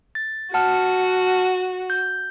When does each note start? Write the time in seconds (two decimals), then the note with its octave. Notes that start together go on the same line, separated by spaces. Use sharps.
0.15 A6
0.54 F#4 F#5 A5 F6
1.90 G6